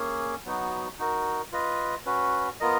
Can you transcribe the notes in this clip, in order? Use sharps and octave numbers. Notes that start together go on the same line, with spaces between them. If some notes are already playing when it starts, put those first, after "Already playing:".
Already playing: A#3 C#4 G#4
F#3 B3 D#4 F#4
D#4 F#4 A#4
F4 B4 D#5
C#4 F#4 B4
B3 F4 A#4 D#5